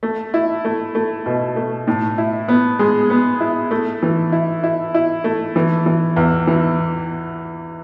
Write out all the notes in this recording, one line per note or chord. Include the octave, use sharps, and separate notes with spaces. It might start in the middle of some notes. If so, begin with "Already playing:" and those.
A3
E4
A3
A3
B2
A3
A2
E4
B3
G#3
B3
E4
A3
E3
E4
E4
E4
A3
E3
E3
E2
E3